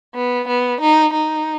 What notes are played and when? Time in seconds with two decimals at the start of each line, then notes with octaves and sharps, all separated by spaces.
0.15 B3
0.48 B3
0.81 D#4
1.14 D#4